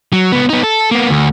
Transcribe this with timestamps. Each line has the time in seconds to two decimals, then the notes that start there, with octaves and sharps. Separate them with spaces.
0.13 F#3
0.32 C#2 B3
0.49 B3 D#4
0.64 A4
0.91 A#3 B3
1.09 D2